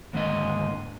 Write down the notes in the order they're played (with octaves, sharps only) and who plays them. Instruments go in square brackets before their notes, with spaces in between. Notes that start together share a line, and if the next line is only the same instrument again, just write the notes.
[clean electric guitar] D#2 G#2 D3 G#3 D#5